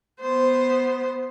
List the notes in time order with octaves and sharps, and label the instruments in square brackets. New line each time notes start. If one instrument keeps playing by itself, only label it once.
[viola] B3 C5